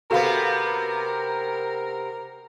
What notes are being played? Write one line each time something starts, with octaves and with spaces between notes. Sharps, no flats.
C3 B3 F#4 A4 A#4 F5